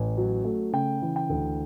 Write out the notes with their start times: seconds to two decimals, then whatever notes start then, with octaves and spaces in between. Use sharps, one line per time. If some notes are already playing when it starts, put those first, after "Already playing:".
Already playing: A1
0.17 F#3
0.44 A3
0.73 C#3 G5
1.02 E3
1.16 G5
1.29 D2